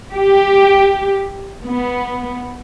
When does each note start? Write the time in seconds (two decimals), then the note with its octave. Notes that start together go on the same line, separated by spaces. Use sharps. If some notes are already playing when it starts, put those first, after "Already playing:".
0.13 G4
1.64 B3